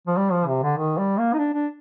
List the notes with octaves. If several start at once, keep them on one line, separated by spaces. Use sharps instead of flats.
F3
G3
F3
C3
D3
D#3
G3
A#3
D#4
D4
D4